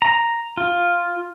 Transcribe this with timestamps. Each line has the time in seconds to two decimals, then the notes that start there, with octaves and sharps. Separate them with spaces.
0.02 A#5
0.57 F4